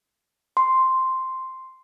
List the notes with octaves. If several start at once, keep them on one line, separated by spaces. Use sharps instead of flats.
C6